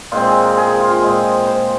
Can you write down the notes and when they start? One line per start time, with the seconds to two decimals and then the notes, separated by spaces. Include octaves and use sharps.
0.12 A#2 G#3 C4 F4
0.27 G#4
0.42 A#4
0.57 G#4
0.68 G#4
0.80 F4
0.91 F4
1.02 A#2 G#3 C4 G#4
1.47 C5